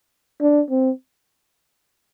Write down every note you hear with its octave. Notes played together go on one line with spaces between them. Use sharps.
D4
C4